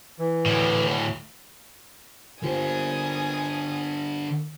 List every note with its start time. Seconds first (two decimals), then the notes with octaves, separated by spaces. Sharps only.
0.19 E3
0.46 D2 A2
2.43 D3 A#3 F4 G4 C5 G#5 D#6